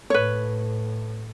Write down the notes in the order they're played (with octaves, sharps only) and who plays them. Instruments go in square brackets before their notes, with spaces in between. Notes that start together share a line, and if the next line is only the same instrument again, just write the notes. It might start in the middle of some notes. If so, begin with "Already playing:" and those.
[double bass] A2 [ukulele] B4 C#5